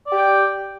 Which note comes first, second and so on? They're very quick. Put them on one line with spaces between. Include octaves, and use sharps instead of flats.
D5 G4 G5